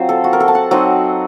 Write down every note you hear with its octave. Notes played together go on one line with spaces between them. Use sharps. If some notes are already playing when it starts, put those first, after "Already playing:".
Already playing: F#3 C4 F4 C5
A4
F#4
A#4
A4
A5
F#5
F#3 C4 D#4 D#5